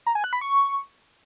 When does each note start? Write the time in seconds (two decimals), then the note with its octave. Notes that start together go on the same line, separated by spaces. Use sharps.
0.06 A#5
0.15 G#5
0.24 F#6
0.33 B5
0.41 C#6